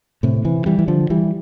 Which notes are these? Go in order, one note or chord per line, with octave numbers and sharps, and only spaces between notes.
A2 C3
C3 E3
E3 G3
E3
D3 F3
E3 G3